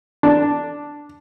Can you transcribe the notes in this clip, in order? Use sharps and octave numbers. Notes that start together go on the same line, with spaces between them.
D4